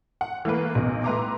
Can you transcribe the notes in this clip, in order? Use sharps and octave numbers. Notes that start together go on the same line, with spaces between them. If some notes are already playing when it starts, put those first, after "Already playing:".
F#5
E3 A3 A#3 B4
B1 E2
A2 B4 E5 A#5 C6 D6